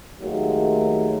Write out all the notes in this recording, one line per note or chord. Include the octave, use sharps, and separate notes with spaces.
D#2 D#3 F#3 G#3 A3